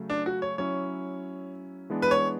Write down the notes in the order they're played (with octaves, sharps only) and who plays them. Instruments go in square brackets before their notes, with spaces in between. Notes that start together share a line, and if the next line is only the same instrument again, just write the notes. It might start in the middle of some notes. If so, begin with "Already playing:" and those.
Already playing: [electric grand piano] C#3 F#3 A3
[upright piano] D4
F#4
C#5
[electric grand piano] F#3 C#4 E4 [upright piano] C#5
[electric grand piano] E3 G#3 B3 D4
[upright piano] B4
C#5